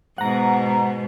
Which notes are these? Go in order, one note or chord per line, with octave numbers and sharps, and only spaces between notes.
G#2 B2 F#5 A#5